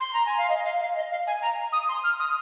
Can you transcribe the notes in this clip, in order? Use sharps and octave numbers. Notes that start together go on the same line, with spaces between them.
C6
A#5
G#5
F5
D#5
F5
F5
D#5
F5
G#5
A#5
D#6
C6
F6
D#6